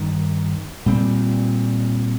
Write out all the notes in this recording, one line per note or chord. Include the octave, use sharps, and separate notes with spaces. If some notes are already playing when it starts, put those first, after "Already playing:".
Already playing: G2 D#3
A#2 G3 C4